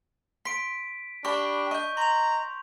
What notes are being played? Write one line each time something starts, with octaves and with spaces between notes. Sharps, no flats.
C6 B6 D7
D4 G4 B5 C#6
D#5 C#6 G6
A#5 C6 F7